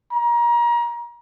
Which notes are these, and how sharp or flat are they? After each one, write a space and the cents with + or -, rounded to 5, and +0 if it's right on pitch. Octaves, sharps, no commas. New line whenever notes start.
A#5 +30